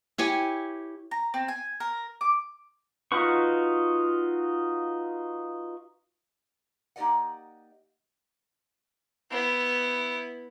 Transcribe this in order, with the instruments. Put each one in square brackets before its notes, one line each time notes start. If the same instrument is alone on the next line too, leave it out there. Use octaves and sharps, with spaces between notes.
[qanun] E4 G4 C#5 G#5
[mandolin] A#5
C4
G#5
A#4
D6
[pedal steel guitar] D#4 F4 F#4 B4 C#6
[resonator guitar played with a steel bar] A#3 D#4 G4 D5 D#5 F#5
[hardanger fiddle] B3 E4